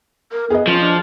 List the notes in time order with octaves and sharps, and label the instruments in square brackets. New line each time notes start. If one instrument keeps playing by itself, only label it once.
[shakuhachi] A#4
[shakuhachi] B3 [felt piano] G#4 D#5
[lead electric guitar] F3 [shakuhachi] C#4
[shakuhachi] D4